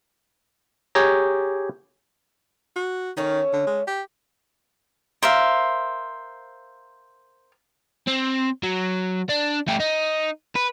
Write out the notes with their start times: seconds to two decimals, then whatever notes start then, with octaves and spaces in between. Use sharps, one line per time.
0.95 G4 G#4 C#5 A#5
2.76 F#4
3.17 D#3 A3 C#4 C#5
3.53 D3
3.67 G#3
3.87 G4
5.23 A#4 C5 E5 F5
8.07 C4
8.63 F#3
9.29 D4
9.68 A3 G4
9.80 D#4
10.56 B4